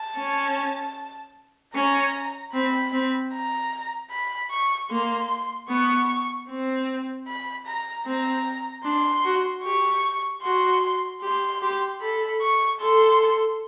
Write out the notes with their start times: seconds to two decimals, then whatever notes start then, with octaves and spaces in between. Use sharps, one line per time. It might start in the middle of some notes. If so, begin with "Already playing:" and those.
Already playing: A5
0.16 C#4
1.75 C#4 A#5
2.54 C4 B5
2.93 C4
3.33 A#5
4.11 B5
4.51 C#6
4.90 A#3 C6
5.69 B3 C#6
6.49 C4
7.28 B5
7.66 A#5
8.06 C4 A#5
8.85 D4 C6
9.24 F#4
9.64 G4 C#6
10.43 F#4 C6
11.22 G4 C6
11.62 G4
12.01 A4 B5
12.41 C#6
12.80 A4 C6